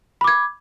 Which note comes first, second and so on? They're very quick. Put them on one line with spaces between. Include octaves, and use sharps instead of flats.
B5 D6 G#6